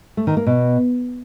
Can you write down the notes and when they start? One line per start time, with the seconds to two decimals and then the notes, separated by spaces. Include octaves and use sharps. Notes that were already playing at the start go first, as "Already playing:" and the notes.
0.17 A3
0.27 D#3
0.37 A#3
0.47 B2